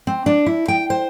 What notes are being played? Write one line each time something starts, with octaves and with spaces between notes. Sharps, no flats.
C4
D4
E4
G5
C5